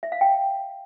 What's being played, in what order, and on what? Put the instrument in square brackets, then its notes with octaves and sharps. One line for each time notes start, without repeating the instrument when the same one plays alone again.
[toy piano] E5
F5
G5